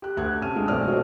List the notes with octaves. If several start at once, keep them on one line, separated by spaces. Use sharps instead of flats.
G4 F#6
D2 F#6 G#6
C3 C#4 A5 F6 D#7
G#3 D4 F4
B1 E3 A3 C4 D5 F6
F#4 A4 C5 C#5 D#5